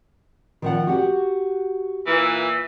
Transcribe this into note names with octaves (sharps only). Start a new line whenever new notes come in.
D#3 F3 F#5
F#4 G4 F#5
A#2 E3